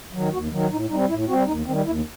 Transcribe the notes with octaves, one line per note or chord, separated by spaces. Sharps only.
D#3 F#3
D#2 F#4
D#3 F#3
A2 D#4
G3 C4 D#4
A2 E4
C4 F#4
G3
D#2 D#4
D#3 G3 C4
D#2 E4